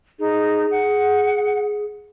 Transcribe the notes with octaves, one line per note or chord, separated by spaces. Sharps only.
D#4 G#4
F#5